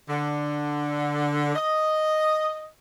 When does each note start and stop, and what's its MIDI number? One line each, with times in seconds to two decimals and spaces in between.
0.08 1.55 50
1.55 2.66 75